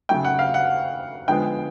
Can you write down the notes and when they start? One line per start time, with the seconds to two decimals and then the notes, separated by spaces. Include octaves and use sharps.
0.09 C#3 F#3 A3 G5
0.25 F#5
0.39 F5
0.54 F#5
1.28 D3 F3 G#3 B3 G5